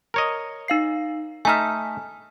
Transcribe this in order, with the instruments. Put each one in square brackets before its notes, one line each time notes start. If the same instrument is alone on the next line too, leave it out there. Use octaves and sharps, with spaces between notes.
[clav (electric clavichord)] A#4 C#5 D#5
[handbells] D#4 F5 C7
[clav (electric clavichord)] A3 D#4 E5 [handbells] G#5 F6